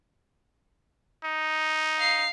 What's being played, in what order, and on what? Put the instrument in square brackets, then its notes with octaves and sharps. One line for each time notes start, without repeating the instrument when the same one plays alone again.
[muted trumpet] D#4
[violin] F5 C7